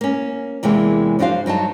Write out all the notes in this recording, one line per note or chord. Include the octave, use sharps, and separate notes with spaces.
A#3 C#4
E2 C3 E3 G#3 A#3
F#2 F3 D4 F#4 C5 F5
G2 F#3 D#4 A5